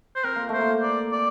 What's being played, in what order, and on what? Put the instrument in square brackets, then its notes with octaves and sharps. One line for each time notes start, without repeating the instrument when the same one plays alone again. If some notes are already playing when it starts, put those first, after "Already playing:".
[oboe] C5
[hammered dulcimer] C4 [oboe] A#4
[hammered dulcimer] A#3
[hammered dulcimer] A3 [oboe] C5
[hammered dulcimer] A#3
[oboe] D5
D5